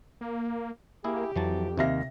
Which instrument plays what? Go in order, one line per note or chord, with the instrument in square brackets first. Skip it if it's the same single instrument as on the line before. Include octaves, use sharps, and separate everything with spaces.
[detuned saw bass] A#3
[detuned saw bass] A#3 [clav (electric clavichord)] E4 G#4 [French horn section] G4
[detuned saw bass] F2 [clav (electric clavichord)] E3 F#3 A5
[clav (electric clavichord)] D#2 D#3 F5 [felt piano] C3 E5 A#6